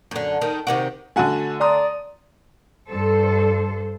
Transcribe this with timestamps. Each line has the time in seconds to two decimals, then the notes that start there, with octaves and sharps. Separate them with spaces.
0.11 F#2 D3
0.41 D#3
0.67 C3 D#3 F#4
1.16 D3 A3 F#4 F#5 G#5
1.61 D5 A#5 C6 D#6
2.88 G2 A4 C5